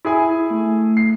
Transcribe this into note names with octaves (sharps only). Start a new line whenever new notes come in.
E4 G#4 G#5
A3
C7